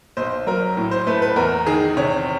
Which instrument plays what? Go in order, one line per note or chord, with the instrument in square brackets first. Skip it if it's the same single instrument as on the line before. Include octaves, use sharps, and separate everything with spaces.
[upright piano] B1 C5
F#3 A#4
A2
C5
A3 B4
B4
E2 A#4
D#3 G#4
C3 C#5